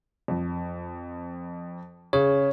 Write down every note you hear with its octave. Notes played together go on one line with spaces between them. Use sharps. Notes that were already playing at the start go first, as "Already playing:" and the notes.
F2
C#3 C#5